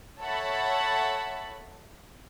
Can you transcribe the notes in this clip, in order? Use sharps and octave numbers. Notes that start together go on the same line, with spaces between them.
A4 C#5 E5 F#5 A5 B5